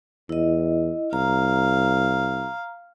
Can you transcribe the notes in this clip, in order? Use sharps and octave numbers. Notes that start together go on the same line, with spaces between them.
E2 E4 D#5
C2 F5 A#5